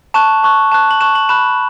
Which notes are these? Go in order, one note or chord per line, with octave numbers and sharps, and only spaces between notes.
A5 C#6 F#6 E7
A5 C#6 F#6
A5 C#6 F#6 E7
F#7
A5 C#6 F#6 E7
F#7
B5 F#6 E7